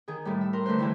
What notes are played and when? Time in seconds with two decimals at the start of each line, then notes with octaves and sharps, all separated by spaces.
0.08 D#3 G#4
0.25 A2 G3
0.41 E5
0.53 A#4 C6
0.66 D3 A3 B4 C5
0.79 G#2 E3 G3 E4